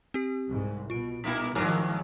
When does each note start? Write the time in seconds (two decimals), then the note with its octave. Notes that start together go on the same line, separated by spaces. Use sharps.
0.14 C4 G4
0.49 C2 G#2
0.90 B2 F4 D7
1.24 G2 B2 A#3 B3 E4 B6
1.55 G#1 G#2 D#3 F3 F#3 A#4 D6